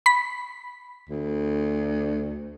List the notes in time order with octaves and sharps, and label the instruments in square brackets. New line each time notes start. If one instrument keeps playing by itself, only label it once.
[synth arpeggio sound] B5 B6
[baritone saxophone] D2